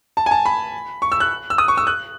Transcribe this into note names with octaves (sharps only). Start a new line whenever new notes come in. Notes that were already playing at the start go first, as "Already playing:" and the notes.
A5
G#5
A5
B5
C#6
E6
F#6
E6
D#6
C#6
E6
F#6